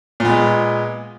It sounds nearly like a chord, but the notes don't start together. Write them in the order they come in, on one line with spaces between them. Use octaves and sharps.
A#2 B3 G#3